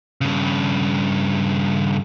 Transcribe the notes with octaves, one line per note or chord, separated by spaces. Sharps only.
G2 C#3